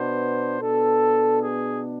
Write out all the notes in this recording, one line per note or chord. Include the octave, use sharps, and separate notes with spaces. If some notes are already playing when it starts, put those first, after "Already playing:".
Already playing: B2 B3 D4 C5
B2 B3 D4 A4
G#4